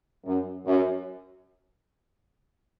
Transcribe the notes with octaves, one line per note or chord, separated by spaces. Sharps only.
F#2
F#2